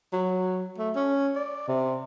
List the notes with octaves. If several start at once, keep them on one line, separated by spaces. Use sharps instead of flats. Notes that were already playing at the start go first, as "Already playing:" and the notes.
F#3
A3
C#4
D5
C3